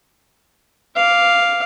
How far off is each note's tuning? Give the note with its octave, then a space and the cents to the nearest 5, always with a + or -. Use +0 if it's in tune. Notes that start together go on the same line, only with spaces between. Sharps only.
F5 +0 D6 -5